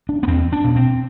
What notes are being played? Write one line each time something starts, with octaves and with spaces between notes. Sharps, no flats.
D4
B3
E2 C4
D4
B2
C4